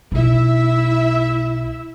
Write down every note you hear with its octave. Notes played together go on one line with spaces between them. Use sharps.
B1 E4 E5